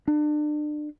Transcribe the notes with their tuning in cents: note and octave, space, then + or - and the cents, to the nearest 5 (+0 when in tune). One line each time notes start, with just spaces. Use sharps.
D4 +35